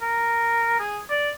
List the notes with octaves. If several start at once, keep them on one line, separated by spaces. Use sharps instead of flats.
A#4
G#4
D5